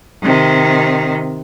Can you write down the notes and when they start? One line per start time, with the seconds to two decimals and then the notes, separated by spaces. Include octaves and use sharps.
0.23 C3 D#3